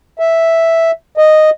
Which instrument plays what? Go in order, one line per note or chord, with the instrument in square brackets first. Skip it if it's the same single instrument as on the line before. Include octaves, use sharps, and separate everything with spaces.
[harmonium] E5
D#5